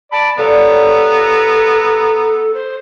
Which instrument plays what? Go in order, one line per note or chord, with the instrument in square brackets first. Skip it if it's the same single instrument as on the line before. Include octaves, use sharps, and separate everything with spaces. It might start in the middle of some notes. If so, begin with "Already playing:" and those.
[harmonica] D5 B5 [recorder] A5
[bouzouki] G3 F4 C#5 [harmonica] B3 A#5 [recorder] A4
[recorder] C5